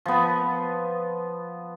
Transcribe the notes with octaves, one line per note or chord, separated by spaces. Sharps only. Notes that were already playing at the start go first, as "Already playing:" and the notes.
F3 B3